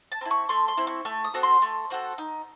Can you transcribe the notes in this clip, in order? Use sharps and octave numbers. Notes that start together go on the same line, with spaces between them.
A5
C4 E4
C#6
A3 C6
C6
C4 E4
C#6
A3
D#6
C4 F#4 A4
C6
A3
C4 F#4 A4
D#4